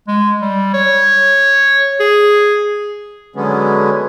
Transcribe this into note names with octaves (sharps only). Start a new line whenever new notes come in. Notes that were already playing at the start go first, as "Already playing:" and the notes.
G#3
G3
C#5
G#4
D3 F#3 G#3 B3 C#4